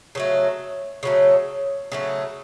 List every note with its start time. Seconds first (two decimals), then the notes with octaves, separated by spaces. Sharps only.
0.15 C#3 F#3 A3
1.03 C#3 F#3 A3
1.92 C#3 F#3 A3